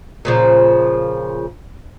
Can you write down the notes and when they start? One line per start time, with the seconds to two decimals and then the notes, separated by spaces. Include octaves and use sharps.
0.25 A#2 C#3 F3